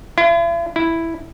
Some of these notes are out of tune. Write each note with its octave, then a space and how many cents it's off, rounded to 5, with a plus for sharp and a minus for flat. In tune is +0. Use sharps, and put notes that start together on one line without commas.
E4 +45
E4 +0